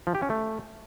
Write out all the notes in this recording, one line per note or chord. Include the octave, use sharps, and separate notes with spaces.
F3
G4
C#4
A3